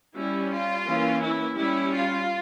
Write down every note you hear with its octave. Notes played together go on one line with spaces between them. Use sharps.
G3 C#4 E4
F4
E3 A#3 C#4
E4
G3 C#4 E4
F4